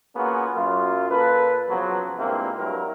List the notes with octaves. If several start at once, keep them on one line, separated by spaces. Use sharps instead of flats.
A#3 B3 C#4 F4 F#4 G#4
F#2 F4
A#2 A#3 A4 B4
C#3 F3 F#3 B3
G2 A#2 G#3 A#3 C4 E4
G2 F#3 E4 A#4